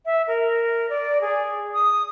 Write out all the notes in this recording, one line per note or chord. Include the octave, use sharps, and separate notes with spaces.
E5
A#4
D5
G#4
D#6